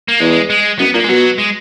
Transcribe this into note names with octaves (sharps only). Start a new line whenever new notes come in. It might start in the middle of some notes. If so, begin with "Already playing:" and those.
A#3
E2 G#3
G#3
F#2 B3
A#2 A#3
G#3
B2 F#3
G#3